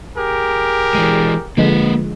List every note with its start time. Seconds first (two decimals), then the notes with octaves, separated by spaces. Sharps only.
0.17 G4 G#4 A#4
0.95 E3 G#3
1.57 D3 F3 G#3 A#3 B4